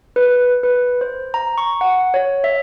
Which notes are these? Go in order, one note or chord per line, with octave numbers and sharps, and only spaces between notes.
B4
B4
C5
A#5
C#6
F#5
C#5
E5